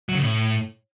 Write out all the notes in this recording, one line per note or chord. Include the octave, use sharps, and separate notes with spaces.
F#3
C#3
A2